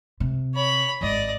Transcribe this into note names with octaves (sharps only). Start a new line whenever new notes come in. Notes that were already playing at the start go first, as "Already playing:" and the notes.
C3
C#5 B5
G#1 G#2 D5 D#5